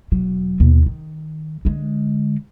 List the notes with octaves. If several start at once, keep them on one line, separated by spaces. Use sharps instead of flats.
E1 F#3
D#2 B2
D#3
D3 G#3